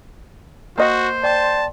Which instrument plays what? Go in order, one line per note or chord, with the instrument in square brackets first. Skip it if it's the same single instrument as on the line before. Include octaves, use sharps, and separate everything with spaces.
[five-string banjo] A#3 D#5 F#5 [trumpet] F#4 [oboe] C5
[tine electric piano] D5 G5 C6 [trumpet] A5